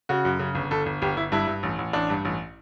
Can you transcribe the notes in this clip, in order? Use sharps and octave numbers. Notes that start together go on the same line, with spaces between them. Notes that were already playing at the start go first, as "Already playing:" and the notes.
C#3 F#4
F#2
C#3
G1
G1 A4
G1
G1 G4
G1 E4
G2 E4
G2
A1
A1
A1 D4
G2
A1